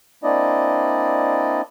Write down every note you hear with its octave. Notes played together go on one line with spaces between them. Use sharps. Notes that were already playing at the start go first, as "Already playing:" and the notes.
A#3 C4 D4 E4 D5 D#5